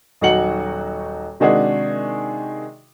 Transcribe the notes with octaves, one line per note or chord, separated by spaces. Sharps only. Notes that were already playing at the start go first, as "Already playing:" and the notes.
D#1 F#3 D#4 F#4 C#7 F#7
C3 D#3 G#3 D4 F#4 G#4